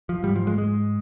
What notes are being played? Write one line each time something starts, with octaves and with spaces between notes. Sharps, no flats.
F3
G#2 G3
F3
G#3
G#3